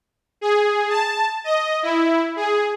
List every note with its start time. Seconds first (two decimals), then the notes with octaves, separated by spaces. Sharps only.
0.41 G#4
0.90 A5
1.44 D#5
1.83 E4
2.36 G#4